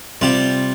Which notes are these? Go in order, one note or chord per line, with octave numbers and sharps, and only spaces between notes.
C3 G3 F4